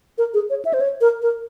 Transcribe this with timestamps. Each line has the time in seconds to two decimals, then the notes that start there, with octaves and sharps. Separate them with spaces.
0.18 A#4
0.34 G#4
0.50 C#5
0.65 E5
0.74 C5
0.80 C#5
1.01 A#4
1.22 A#4